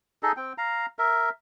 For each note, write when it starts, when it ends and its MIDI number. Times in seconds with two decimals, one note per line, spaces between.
0.23 0.32 63
0.23 0.32 68
0.23 0.32 69
0.23 0.32 75
0.37 0.53 60
0.37 0.53 79
0.58 0.86 77
0.58 0.86 82
0.99 1.30 70
0.99 1.30 76